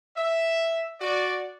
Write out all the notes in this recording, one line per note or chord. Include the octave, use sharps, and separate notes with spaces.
E5
F#4 D5